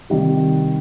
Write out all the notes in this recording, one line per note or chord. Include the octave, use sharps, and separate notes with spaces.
C3 D#3 G3